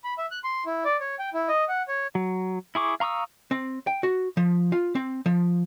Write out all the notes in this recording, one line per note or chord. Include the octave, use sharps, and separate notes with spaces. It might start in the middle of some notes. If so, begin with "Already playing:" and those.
B5
E5
F#6
C6
E4
D5
C#5
G5
E4
D#5
F#5
C#5
F#3
E4 G#4 C#6 D6
F5 A#5 C#6 D#6 E6
C4
G5
F#4
F3
F4
C4
F3